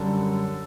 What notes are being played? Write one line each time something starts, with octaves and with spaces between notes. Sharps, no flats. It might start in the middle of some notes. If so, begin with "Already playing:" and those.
Already playing: F#2 D3 G3 A4